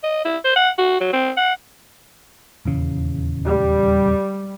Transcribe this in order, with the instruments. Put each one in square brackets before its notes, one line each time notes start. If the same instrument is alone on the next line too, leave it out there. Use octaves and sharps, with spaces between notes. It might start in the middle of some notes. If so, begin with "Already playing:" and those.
[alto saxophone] D#5
E4
C5
F#5
F#4
F#3
C4
F#5
[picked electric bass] D#1 E2 C#3
[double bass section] G3